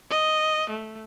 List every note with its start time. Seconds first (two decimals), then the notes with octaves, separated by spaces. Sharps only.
0.11 D#5
0.70 A3